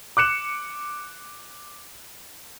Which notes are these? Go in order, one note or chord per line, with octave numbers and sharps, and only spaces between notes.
D6 F#6 C#7 E7